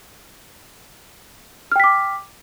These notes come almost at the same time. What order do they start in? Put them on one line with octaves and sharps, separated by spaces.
F6 G5 B6 D6